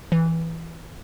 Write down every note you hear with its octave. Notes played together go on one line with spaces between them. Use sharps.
E3